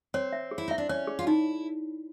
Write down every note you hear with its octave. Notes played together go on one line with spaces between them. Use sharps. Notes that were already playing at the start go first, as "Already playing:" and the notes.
C4 C#5
E5
G#4
E4
D#4 E5
D4
C#4 C#5
G#4
F4
D#4 E4